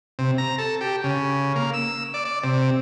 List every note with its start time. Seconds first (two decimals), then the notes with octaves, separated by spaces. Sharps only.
0.19 C3
0.38 A#5
0.58 A4
0.81 G4
1.04 C#3
1.56 A#3
1.74 E6
2.14 D5
2.25 D5
2.44 C3